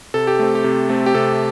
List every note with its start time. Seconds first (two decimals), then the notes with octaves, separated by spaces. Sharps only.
0.14 C3 A4
0.27 G4
0.39 A3 C4
0.55 G4
0.64 C3
0.89 A3 C4
1.06 G4
1.14 C3 A4